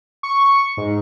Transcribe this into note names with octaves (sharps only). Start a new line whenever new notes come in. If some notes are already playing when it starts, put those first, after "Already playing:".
C#6
G#2